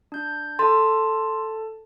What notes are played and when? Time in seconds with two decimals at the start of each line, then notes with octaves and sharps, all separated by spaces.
0.12 D4 G6
0.59 A4 A5 C6 A6